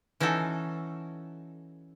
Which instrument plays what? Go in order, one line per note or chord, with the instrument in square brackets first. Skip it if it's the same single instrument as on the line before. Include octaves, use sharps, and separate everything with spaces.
[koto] E3 C#4 D#4 F#4 A4